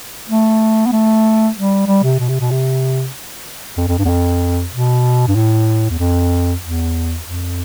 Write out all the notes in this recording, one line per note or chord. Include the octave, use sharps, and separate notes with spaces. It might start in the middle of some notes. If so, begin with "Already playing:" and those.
A3
B3
A3
G3
G3
C3
B2
C3
B2
C3
F2
F2
G2
E2
F2
B2
G2
A2
E2
F2
E2
F2